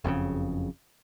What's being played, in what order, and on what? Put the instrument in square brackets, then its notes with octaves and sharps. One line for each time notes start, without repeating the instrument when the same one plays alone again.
[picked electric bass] F#1 F2 A#2 C#3